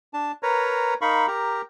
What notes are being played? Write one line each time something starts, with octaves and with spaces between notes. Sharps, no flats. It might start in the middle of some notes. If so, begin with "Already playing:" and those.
D4 A5
A#4 B4 C#5 A#5
D#4 A#4 F5 B5 C#6
G4 A#4 A#5